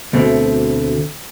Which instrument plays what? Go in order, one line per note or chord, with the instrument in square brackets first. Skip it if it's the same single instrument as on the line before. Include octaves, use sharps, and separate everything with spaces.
[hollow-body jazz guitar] D2 B2 A3 C4